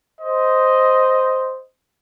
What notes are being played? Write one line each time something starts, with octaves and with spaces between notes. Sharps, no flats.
C5 D#5